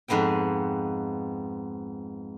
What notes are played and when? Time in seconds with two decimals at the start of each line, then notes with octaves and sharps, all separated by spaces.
0.08 F2 G#2 B3 C5 G5